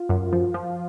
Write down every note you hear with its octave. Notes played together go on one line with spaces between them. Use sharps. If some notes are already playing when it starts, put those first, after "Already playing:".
Already playing: F4
F#2
F3
F3